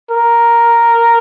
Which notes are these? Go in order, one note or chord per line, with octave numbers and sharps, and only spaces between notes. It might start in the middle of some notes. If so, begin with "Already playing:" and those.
A#4